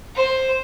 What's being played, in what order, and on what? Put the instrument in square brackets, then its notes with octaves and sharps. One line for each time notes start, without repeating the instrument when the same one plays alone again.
[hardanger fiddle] C5